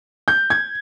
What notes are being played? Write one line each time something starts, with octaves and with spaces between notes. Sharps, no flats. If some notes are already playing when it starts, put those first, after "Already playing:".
G6
G#6